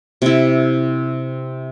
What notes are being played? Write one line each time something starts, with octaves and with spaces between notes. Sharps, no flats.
C3 E4